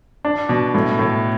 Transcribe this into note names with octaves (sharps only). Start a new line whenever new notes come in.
D4
B2
A2
A2